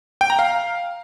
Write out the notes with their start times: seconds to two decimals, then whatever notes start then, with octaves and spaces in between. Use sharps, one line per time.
0.21 G5
0.30 A#5
0.39 F5